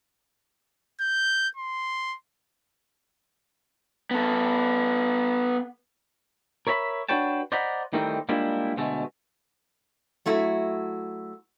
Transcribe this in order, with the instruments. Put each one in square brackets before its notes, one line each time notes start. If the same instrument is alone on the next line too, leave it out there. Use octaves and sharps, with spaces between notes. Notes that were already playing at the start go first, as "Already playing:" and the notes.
[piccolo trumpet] G6
C6
[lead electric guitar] B3 A4
[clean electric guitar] A#4 C#5 E5 A#5 B5
D4 F#4 B4 C#5 G5 A5
C5 D5 D#5 F#5 A#5 B5
D#3 E3 G3 A3 C4 D#4
G3 G#3 A#3 D4 E4 F4
D2 B2 G#3 A3
[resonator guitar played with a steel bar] F#3 A3 E4 F#4